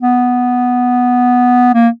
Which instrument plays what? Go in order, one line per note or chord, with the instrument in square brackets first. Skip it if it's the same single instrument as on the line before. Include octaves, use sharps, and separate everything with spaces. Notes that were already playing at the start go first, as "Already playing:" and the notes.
[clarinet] B3
A#3